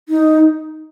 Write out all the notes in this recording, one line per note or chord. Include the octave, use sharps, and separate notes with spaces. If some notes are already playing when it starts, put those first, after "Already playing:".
D#4